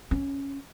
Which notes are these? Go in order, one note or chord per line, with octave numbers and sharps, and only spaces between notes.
C#4